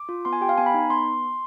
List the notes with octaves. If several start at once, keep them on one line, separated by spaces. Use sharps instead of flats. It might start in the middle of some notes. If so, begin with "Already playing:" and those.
Already playing: D6
F4
B3 C6
G#5
G4 G5
F5
B3 G#5
B5
D#4
B3 C6